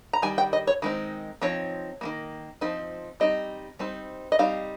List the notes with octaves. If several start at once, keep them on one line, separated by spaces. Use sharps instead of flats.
A#5
D#3 G3 G#5
G5
D#5
C#5
D#3 G#3 C4 D#4
F3 C4 D#4 C#5
D#3 G3 A#3
F3 C4 D#4
G3 C4 D#4 D#5
G3 C4 D#4
D#5
G3 C4 D#4 F5